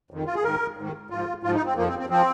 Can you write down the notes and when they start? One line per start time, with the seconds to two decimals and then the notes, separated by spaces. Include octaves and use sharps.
0.11 F2 D#3
0.26 F4
0.35 G#4
0.43 G#2 D#3 A#4
0.77 G#2 D#3
1.10 G#2 F3 F4
1.43 G#2 F3 F4
1.54 D#4
1.66 C4
1.76 F2 F3 A#3
1.88 C4
1.99 C4
2.10 F3 C4